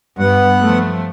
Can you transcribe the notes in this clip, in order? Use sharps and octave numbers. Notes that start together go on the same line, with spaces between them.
G2 B3 F#5
F3 A3